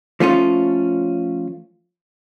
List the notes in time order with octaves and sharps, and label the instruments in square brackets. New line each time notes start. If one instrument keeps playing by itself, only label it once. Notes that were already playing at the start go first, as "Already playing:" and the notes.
[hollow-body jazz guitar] F3 A3 C#4 F4